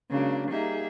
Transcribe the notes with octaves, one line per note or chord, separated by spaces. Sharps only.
C#3 F#3 G#3 A#3 D4
G3 A#3 D#4 G#4 E5